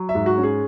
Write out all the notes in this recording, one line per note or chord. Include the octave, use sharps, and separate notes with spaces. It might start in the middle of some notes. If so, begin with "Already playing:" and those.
Already playing: F#3
E5
G#2
F#4
C#4
G#4